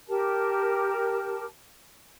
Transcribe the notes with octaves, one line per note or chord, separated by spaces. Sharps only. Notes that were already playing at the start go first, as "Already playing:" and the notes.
G4 A#4 A5